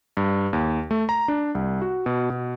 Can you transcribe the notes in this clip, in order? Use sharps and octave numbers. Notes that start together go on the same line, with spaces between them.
G2
D#2
A3
A#5
D4
C2
F#4
B2
B2